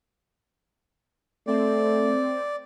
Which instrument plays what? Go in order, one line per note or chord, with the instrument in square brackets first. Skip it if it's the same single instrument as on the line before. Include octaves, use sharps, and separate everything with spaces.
[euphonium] A3 [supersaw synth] C4 [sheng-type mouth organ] D5